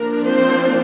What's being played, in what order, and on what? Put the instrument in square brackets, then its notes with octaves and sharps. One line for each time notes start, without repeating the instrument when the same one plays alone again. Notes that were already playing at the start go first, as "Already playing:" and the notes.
Already playing: [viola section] F3 A#3 D4 A#4
C4 C5